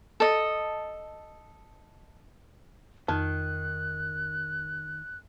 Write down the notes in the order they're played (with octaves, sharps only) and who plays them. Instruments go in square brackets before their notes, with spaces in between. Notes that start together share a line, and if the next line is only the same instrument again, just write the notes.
[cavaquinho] A4 D#5
[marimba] F2 [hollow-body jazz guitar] D#3 [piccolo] F#6